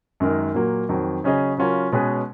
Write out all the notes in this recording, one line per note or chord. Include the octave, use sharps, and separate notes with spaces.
F#2 D#3 G#3 D#4 A#4
A#2 F#3 A#3
F2 D#3 F#3
C#3 F#3 C#4 G#4 D#5
C#3 F#3 C#4 F4 A#4
B2 G#3 C#4 G#4 B4